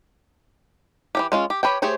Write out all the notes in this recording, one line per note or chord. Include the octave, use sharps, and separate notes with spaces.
E3 F#3 G4
G#3 C#4 F4
G4
G4 B4 C#5 G5
A3 G4 G#4 C5 C#5